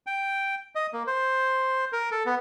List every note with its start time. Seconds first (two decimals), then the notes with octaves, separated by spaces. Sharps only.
0.07 G5
0.75 D#5
0.93 A#3
1.07 C5
1.92 A#4
2.12 A4
2.26 B3